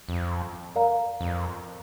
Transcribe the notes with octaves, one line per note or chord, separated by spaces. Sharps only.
F2
A#4 D5 F5 A#5
F2